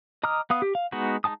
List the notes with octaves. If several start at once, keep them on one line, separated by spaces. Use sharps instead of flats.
D#5 A#5 D6 D#6 F6
B3 F5 D#6
G4
F5
G#3 B3 D#4 F#4
G#3 D#4 G#5 A5 D#6